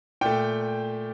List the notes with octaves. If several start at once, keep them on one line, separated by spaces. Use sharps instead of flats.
A#2 A3 G5